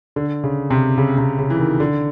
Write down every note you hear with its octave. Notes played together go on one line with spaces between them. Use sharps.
D3
C#3
C3
C#3
C3
C#3
E3
D#3
D3